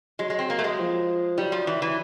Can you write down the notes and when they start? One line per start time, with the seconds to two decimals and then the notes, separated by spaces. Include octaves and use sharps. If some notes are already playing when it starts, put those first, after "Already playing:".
0.19 F#3 G#3
0.30 G#3
0.39 C4
0.50 A#3
0.59 A3
0.64 G#3
0.79 F3
1.38 F#3 G3
1.52 F3
1.67 E3
1.82 E3